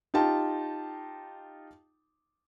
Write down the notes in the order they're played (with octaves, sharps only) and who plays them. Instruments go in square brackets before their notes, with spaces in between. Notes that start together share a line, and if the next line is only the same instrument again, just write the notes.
[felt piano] D#4 F4 G4 A5